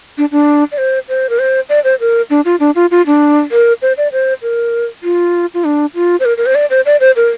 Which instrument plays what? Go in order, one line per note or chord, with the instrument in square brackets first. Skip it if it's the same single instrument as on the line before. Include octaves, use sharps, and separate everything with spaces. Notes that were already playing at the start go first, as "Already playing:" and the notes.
[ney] D4
D4
D5
C5
C5
A#4
C5
D5
C5
A#4
D4
F4
D4
F4
F4
D4
A#4
C5
D5
C5
A#4
F4
F4
D4
F4
C5
A#4
A#4
C5
D5
C5
D5
C5
A#4